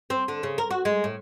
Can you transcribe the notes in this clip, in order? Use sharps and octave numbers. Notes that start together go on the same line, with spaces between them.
C4
D3
C#3
A#4
F#4
G#3
A2